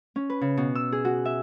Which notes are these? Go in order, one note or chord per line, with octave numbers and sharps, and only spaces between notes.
C#4
B4
C#3
B2
E6
G#4
F#4
E5